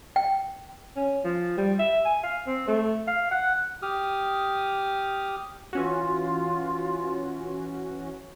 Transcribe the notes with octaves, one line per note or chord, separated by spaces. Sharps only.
G5
C#4
F3
G3
E5
G#5
F5
C4
A3
F5
F#5
G4 D#6 F6
E3 C#4 F4 F#4